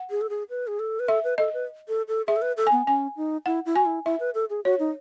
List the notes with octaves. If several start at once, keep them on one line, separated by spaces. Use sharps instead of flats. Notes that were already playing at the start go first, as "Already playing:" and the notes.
Already playing: F#5
G#4
A4
G#4
B4
G#4
A4
B4
A4 E5
B4
A4 D#5
B4
A4
A4
G#4 E5
A4
B4
A4
G#5
B3
C#4 G#5
D#4
E4 F#5
E4
F#4 G#5
E4
E4 E5
B4
A4
G#4
F#4 C#5
D#4